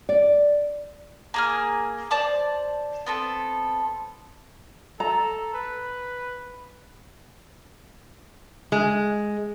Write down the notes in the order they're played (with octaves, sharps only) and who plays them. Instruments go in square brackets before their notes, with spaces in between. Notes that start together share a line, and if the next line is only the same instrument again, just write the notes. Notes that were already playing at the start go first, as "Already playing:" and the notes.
[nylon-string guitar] D5
[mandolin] A#3 G#4 F6
C5 D5 A5 D6
B3 C4 A4
[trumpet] A4 [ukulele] A#5
[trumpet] B4
[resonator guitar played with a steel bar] G#3